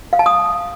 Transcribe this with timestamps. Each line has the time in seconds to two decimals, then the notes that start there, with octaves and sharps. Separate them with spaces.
0.13 F5
0.19 A5
0.26 D#6